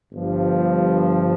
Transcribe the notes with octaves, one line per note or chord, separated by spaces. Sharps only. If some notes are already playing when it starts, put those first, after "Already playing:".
G1 G2 F3